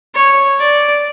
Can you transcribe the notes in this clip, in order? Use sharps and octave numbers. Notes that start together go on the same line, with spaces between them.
C#5
D5